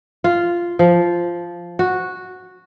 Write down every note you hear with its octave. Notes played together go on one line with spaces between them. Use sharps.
F4
F3
F#4